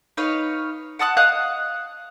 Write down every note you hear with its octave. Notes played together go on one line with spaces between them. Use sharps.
D#4 B4 C#5 F5
F#5 A5 D#6 F#6
D#5 F5 D#6 F#6